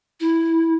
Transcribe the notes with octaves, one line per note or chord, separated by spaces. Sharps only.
E4